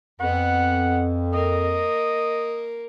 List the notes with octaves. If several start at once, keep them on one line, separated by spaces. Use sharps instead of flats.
F2 B3 F#5
A#3 D#5